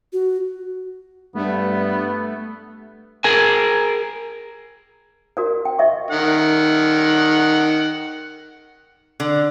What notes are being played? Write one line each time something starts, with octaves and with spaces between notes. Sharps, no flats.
F#4
G2 A3 B3
G#4 A#4 G#5
F#4 A#4 D5
G5
D#5 E5 C#6
D#3 F#5
D3